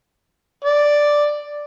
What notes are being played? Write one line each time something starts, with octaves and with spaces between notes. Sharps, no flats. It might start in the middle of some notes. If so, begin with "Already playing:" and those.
D5